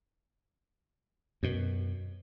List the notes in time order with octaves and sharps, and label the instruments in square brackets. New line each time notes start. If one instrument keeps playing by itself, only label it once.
[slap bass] F#2 B2